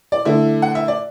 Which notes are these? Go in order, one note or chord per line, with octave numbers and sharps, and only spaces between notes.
D5
D3 A3 E4 E5
F#5
E5
D5